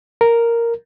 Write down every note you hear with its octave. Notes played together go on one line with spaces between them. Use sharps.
A#4